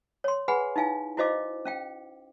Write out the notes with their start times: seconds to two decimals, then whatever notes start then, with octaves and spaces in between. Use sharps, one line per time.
0.24 C#5 C6
0.48 G#4 B4 F#5 G#5 B5
0.76 D#4 E4 F5 G#5
1.17 E4 F#4 C5 D#5 F5 D6
1.65 C#4 F5 G5